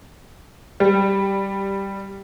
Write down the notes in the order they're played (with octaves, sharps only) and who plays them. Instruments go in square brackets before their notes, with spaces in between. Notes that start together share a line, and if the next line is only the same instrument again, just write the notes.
[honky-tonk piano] G3